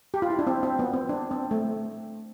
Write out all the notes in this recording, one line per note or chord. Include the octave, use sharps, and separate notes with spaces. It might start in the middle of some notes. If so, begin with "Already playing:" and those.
G4
F4
E4
D4
C4
C4
B3
C4
D4
C4
A3